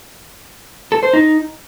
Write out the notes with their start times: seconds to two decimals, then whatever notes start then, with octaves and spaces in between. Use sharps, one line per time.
0.92 A4
1.03 C5
1.13 D#4